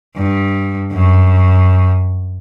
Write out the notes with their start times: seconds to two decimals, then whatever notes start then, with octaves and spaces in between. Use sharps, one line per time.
0.16 G2
0.92 F#2